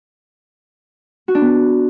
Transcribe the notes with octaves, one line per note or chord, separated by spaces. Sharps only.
F#4
D4
B3